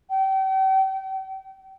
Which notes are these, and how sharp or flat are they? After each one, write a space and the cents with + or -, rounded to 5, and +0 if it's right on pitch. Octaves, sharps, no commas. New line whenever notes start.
G5 -35